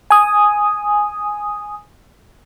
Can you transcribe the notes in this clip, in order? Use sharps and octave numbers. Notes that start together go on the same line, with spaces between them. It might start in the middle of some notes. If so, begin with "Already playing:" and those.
G#5 D#6